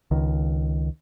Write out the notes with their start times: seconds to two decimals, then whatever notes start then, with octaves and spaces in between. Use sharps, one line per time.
0.11 C#2 D#3